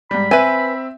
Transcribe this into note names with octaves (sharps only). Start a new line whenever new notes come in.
G#2 G3 B5
C4 B4 E5 G#5